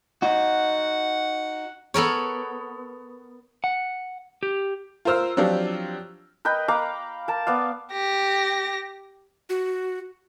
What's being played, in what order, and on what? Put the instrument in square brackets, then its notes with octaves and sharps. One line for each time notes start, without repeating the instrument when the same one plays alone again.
[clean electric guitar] D#4 F#4 [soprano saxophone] F#5
[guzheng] B3 A4 A#4 C#5
[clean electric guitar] F#5
G4
[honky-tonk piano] F4 A#4 C5 E6 F6
F3 F#3 C4 D4 F4 G4
[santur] A#4 B4 D#5 G5
F5 A#5 B5 D6
A#4 A5
B3 D5 F5
[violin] G4 A#6
[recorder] F#4